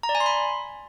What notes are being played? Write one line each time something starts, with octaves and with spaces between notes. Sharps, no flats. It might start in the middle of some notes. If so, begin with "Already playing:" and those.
A#5
D5
G#5
C6
B5